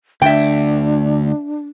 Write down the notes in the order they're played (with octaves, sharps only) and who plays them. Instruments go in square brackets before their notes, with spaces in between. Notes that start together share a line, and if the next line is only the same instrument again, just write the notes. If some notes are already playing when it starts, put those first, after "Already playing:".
[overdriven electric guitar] D2 [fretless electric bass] D3 [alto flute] D4 [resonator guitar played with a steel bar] E5 G5